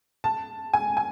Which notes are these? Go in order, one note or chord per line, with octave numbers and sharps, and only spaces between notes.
A5
G#5
G#5